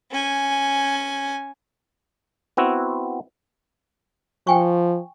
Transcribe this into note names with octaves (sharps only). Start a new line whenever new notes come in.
C#4 G#5
B3 C4 E4 F#4
F3 G5 G#5 C#6